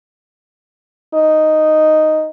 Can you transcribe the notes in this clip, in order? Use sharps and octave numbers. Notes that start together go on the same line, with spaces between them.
D#4